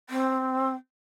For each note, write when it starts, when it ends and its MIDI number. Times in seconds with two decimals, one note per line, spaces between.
0.10 0.73 60